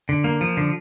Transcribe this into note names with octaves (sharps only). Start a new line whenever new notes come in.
D3
A#3
F3
D3